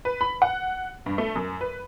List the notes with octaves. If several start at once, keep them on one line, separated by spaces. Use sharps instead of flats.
B4
B5
F#5
G2
A3
F#2
B4